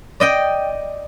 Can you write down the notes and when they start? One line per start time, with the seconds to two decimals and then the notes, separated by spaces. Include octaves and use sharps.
0.20 D5 D#5 G5